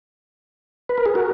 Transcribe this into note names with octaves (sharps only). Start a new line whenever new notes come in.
B4
A#4
G#4
F#4 A#4